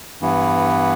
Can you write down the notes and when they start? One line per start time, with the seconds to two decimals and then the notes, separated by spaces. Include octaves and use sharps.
0.21 G2 E3 B3